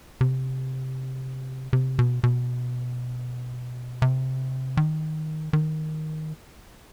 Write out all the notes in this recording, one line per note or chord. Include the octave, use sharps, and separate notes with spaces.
C3
C3
B2
B2
C3
D#3
D#3